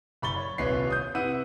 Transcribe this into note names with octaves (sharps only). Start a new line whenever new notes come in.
F#1 B5 C#6 A6 G7
C#5
D#1 C2 C3 B4 C#5 C7
D#6 G6
C3 E4 B4 F#5 E6 D#7